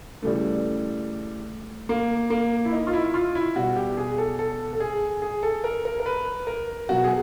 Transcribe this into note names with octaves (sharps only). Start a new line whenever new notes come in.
C#3 E3 G3 A3
A#3
A#3
E4
D#4
F4
E4
F4
E4
B2 G3 F#4
G4
G#4
A4
A4
A4
G#4
G#4
A4
A#4
A#4
A#4
B4
A#4
B2 F#3 F#4
G#4